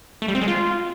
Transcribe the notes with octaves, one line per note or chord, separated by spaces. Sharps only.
A3
G3
C4
G#3
F4